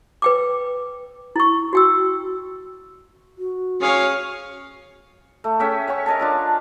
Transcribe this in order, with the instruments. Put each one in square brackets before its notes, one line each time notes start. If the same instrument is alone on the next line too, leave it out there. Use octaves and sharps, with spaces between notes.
[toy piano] B4 G5 D6
E4 C#6
F#4 G5 E6
[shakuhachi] F#4
[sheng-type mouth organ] C#4 G#4 D#6 [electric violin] C#5 F5
[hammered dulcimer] A3
C#4 G#4 E5 G5
C#5 F#5 G#5 C#6
A#4 D#5 G#5 A5
D4 F4 A5